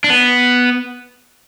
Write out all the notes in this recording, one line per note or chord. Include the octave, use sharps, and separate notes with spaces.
D4
B3